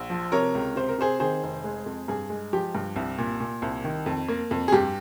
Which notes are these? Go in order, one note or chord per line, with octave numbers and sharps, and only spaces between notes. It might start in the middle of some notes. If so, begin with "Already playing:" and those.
Already playing: A#1
F3
C3 A#4 C#5
C#2
C3 C5
A#4
C3 G#4 C5
D#3 G#4 C5
F1
G#3
F2
G2 G#4
G#3
F3 G4
G2
C2
A#2
A#2
C2
D#3
F2
A#3
F2
G#4
G2 G4